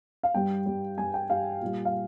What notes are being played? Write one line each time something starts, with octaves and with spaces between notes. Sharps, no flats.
F5
G2 G3 G5
G2 G3
G2 G3 G#5
G5
G2 G3 F5
A#2 G3
F5